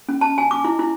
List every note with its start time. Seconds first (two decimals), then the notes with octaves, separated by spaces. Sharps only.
0.09 C#4
0.21 A5
0.38 G#5
0.51 D6
0.64 E4
0.79 E4